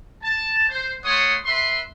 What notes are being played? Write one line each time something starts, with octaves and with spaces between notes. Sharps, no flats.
A5
C5
A3 C#5 F#5 C6 D#6
B4 E5 C6